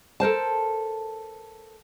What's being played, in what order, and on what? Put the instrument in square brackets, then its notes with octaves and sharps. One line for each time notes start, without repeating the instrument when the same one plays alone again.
[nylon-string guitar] A4 A#4 C5 A5